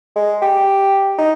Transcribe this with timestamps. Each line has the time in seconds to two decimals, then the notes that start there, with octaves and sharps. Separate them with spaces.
0.16 G#3
0.42 G4
1.18 D#4